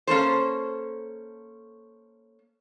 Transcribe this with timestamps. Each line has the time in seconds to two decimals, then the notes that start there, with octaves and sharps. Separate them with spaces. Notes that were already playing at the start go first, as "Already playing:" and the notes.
0.07 A#3 C#4 A4 C5